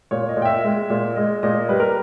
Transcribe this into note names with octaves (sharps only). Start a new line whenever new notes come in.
A#2 C#5
D#5
A#2
G5
E5
G#3
A#2
G#3 D#5
A#2 D#5
G3 B4
A#4